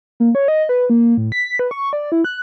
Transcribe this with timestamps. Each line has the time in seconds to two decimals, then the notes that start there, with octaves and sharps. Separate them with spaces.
0.20 A#3
0.35 C#5
0.48 D#5
0.69 B4
0.90 A#3
1.18 A2
1.32 B6
1.59 B4
1.71 C#6
1.93 D5
2.12 E4
2.25 F#6